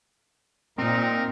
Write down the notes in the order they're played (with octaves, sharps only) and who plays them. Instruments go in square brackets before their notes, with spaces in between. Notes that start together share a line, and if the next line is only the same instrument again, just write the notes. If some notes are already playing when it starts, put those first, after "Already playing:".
[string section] A#2 [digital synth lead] C4 [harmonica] D#4 A#4